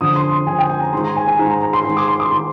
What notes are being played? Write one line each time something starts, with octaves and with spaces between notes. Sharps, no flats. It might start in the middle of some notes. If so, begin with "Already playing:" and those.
F2 D3 D#6
C6
C6
F2 D3 G#5
G5
G#5
A#5
G#2 D#3 C6
A#5
G#5
G#5
G#2 D#3 A#5
A#5
A#5
C6
G#2 D#3 C6
D6
C6
D6
D#3 C6